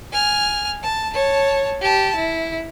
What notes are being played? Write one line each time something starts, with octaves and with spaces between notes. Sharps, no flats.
G#5 F6
A5
C#5 A5
G4 A5
E4